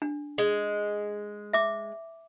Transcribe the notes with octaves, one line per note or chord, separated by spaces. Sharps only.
D4
G#3
E5 D6